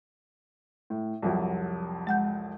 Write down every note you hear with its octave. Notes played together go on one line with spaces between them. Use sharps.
A2
C2 F2 F#3
G#3 F#5 G6